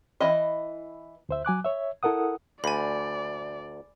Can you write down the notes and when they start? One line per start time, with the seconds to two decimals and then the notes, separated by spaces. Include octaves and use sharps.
0.21 E3 E4 D#5
1.29 D2 C5 E5
1.45 F#3 G#5 D6 F#6
1.64 C#5 E5
2.03 E4 A4 A#4 F#5 D#6
2.64 D2 D5 G#5 B5